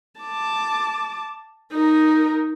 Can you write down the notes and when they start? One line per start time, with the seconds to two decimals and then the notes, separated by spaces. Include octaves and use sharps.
0.21 A5 D6
1.72 D#4 A#4